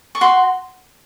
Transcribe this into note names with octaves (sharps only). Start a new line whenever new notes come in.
C#6
F#4 C6